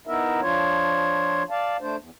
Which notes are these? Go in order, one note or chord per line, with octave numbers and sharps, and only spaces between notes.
B3 D#4 E4 A#4 E5
F3 D4 F4 C#5
D5 F5 A5
A3 D4 C5
E2